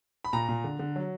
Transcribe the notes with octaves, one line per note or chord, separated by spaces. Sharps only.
B5
A#2 A#5
A#2
D3
D3
F#3